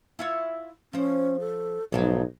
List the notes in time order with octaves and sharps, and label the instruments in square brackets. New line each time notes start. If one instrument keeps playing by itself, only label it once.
[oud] E4 F4 C#5
[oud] F3 C5 [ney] C#4
[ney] A4
[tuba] B1 [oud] G#2 F3 F#3 [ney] D#4